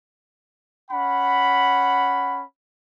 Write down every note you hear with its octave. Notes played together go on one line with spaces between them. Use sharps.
C#4 F#5 B5